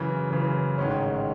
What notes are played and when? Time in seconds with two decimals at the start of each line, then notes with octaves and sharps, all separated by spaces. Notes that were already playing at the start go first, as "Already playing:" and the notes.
Already playing: F#2 C#3 E3
0.30 F#2 C#3 E3
0.78 A1 G#2 D#3 G#3 C#4